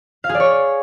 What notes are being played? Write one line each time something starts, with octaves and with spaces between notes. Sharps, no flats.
F5
G#4
D5
C#5